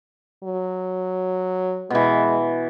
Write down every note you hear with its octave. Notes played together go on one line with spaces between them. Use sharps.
F#3
B2 E3 G#3